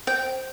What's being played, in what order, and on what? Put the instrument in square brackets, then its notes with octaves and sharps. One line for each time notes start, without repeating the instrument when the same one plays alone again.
[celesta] C5 [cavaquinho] G5